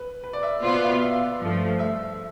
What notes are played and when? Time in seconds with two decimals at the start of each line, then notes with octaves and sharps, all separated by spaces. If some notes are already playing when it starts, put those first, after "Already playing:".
Already playing: B4
0.24 B4
0.33 D5
0.43 E5
0.62 B2 B3 F4 B4 C5
0.73 D5
0.82 E5
0.92 F5
1.01 E5
1.41 G2 F3 A3
1.79 E5